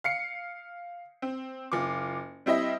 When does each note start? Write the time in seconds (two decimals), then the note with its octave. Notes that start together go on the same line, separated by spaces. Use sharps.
0.04 F5 C7 C#7
1.22 C4
1.72 F#1 F4 D6
2.46 G3 C4 E4 D#5 E5